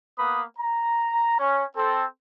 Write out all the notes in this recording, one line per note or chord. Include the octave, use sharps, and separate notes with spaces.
A#3 B3 B4 B5 D#6
A#5
C#4
C4 A4